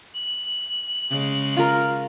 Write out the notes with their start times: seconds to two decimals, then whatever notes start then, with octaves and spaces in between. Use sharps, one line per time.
0.15 F#7
1.10 C#3 G#3
1.57 F4 A#4